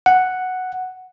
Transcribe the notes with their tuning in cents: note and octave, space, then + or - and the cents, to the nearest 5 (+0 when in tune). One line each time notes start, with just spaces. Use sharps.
F#5 +0